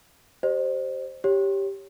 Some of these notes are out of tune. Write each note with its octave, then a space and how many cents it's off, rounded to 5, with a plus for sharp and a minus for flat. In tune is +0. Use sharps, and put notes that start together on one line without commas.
G4 -15 C5 +5 D#5 -45
G4 +0 C#5 +0